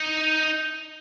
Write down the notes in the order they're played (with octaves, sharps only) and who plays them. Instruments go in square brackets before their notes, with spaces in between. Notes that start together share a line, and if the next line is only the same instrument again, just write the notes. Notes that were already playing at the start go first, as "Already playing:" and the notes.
Already playing: [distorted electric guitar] D#4